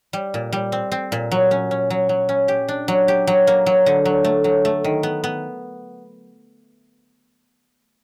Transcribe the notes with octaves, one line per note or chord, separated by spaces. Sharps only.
G3
A#2
G3
C4
C4
A#2
F#3
C#4
C#4
F#3
F#3
C#4
G4
D4
F#3
G4
F#3
A#3
F#3
D3
F#3
A3
F#3
A3
D#3
B3
B3